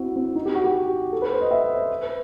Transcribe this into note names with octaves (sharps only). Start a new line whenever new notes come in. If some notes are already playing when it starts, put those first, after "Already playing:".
Already playing: C4 E4 F#4
C4
D#4
G4
F#4
G4
A4
B4
C5
D#5
E5
D#5
C5
B4